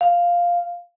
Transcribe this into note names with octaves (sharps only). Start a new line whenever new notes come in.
F5